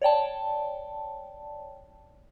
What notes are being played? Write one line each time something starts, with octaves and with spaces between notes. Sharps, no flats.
C#5 D5 G5 A5